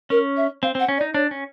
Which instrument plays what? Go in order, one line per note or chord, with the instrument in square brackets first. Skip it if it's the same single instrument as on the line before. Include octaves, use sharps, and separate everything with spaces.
[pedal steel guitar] C#4 [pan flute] A#4
[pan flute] E5
[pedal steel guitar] C4 [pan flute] F5
[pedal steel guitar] C4
[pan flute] F#5
[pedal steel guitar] C#4
[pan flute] D5
[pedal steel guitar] D#4
[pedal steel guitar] D4 [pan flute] C#5
[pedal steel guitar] C#4